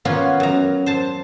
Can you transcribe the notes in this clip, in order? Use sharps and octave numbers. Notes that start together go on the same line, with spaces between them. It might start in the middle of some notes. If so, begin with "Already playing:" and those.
A#3 B3 C#4 F4
F#2 A#5
C5 A5